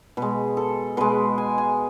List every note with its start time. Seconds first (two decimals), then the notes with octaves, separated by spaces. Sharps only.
0.17 B2 G#3 B4
0.57 A4
0.97 B2 G#3 B4
1.38 G#5
1.58 G#5